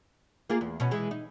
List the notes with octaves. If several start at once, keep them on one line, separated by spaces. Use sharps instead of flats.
A#3 F4 G#4
E2
B2 C#4
E3 G#3
D#4